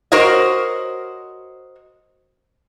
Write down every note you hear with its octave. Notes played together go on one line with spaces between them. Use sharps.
F#4 A#4 C5 C#5 D#5